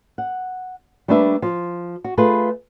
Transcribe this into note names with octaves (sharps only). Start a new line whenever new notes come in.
F#5
G3 A3 A#3 D4 B4 E5
F3
F#4
A3 F4 G#4 B4